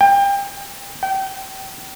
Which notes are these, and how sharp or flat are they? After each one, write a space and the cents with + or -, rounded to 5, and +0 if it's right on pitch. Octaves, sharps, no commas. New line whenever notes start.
G5 +30
G5 -25